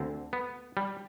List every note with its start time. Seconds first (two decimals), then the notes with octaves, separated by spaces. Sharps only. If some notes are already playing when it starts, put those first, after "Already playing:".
Already playing: D2 D3 C4
0.33 B3
0.77 G3